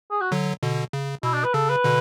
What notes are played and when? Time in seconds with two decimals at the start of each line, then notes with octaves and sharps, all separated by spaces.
0.11 G#4
0.21 F#4
0.32 D3 F#3
0.62 B2 D3
0.93 C#3
1.23 B2 E4
1.33 D4
1.44 B4
1.54 C#3 A4
1.70 B4
1.84 B2 D3